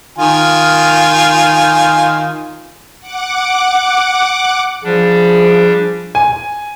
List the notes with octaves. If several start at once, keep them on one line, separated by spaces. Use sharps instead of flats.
D#3 F4 G#5
F#5 D6
F3 G3 D4 G#4
G#5